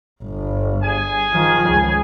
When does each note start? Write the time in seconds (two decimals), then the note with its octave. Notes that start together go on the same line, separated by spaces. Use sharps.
0.24 G1
0.83 G#4 G#5
1.32 D#3 F3
1.70 C#2